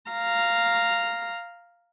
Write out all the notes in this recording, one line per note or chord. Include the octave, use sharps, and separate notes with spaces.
F5 A#5